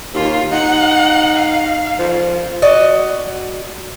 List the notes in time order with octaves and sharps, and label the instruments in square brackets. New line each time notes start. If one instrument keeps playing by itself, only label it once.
[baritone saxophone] D#2 [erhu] F4
[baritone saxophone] D#4 [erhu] F#5
[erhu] F5
[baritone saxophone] F3
[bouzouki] F#4 D5 D#5